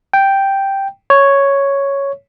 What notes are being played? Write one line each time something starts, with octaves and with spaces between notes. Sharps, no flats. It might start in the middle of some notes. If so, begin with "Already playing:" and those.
G5
C#5